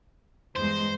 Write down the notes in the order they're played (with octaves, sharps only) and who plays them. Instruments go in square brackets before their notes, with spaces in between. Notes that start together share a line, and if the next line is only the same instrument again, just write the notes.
[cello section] E2 G2 G#3 [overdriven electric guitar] C5